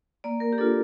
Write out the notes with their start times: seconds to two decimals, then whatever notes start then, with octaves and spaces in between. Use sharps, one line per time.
0.24 A#3 D5
0.40 A#4
0.53 G4
0.58 D4 F4 A4